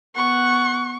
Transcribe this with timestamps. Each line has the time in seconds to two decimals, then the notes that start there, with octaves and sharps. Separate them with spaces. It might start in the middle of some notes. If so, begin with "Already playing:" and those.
0.15 B3 F#5 C#6